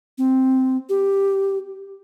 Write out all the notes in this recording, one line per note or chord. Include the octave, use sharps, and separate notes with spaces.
C4
G4